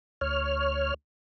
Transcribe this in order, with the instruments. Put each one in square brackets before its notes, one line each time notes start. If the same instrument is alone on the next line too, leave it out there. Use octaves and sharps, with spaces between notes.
[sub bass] D2 [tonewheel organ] C#5 F6